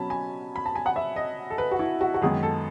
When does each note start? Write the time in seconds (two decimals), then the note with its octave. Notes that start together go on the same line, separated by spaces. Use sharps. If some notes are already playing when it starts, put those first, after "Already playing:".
Already playing: B2 F#3 C#4 A5 B5
0.10 G#5
0.56 B5
0.66 A5
0.76 G#5
0.86 F#5
0.96 E5
1.16 D#5
1.50 A4
1.58 B4
1.71 F#4
1.79 E4
2.01 F#4
2.14 F#4
2.22 F#2 D#3 G#3 B3 G#4
2.43 A4